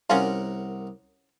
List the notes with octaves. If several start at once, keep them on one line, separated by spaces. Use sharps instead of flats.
C2 C#4 F4 A#4 F#5